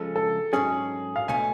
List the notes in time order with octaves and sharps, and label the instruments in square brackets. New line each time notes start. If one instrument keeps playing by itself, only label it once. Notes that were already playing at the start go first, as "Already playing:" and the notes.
Already playing: [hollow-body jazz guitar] C#3 F3 G#3 [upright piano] A4
[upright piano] A4
[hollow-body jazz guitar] G#2 F#3 C#4 [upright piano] G#4
[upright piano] F5
[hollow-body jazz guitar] C#2 B2 A3 [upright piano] G#5